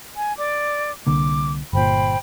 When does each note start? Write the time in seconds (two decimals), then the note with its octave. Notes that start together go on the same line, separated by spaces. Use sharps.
0.17 G#5
0.37 D5 D6
1.07 C2 D3 A#3 D6
1.73 G1 A#2 C5 G5 B5